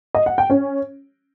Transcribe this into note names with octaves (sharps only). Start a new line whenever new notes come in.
D#5
F#5
G5
C#4